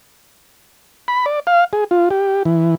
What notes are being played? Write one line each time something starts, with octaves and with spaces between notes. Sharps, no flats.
B5
D5
F5
G#4
F4
G4
E3